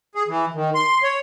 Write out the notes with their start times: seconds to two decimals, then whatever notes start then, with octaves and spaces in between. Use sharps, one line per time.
0.15 G#4
0.28 E3
0.54 D#3
0.75 C6
1.03 C#5